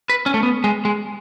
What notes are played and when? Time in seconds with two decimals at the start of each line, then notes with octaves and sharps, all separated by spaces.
0.10 B4
0.26 C#4
0.34 A3
0.43 B3
0.64 G#3
0.85 G#3